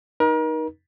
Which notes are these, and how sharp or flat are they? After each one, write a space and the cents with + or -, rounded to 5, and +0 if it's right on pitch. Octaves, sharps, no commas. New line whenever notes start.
D#4 +0 A#4 +35